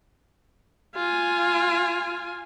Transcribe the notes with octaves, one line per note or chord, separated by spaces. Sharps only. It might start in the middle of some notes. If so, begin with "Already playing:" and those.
F4 G#5